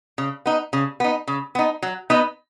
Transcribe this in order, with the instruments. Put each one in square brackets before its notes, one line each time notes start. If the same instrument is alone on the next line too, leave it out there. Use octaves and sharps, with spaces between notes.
[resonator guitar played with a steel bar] C#3
B3 D#4
C#3
B3 D#4
C#3
B3 D#4
F#3
B3 D#4 B4 D#5